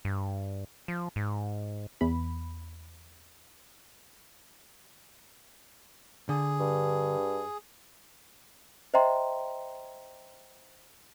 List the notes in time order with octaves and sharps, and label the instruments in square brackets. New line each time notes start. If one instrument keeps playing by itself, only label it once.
[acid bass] G2
F3
G#2
[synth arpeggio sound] E2 B5
[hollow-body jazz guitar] D3 [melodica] G#4
[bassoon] G2
[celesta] C5 D#5 E5 G5 A#5 C6